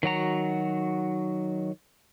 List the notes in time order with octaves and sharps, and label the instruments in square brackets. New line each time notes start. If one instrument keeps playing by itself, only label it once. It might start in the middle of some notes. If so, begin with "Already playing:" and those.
[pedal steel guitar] D#3 F#3 F#4 A#5